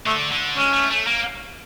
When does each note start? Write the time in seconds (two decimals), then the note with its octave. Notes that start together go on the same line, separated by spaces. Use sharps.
0.06 D3 A3
0.32 D3
0.56 G#3 C#4
0.73 A3
0.91 A3
1.07 A#3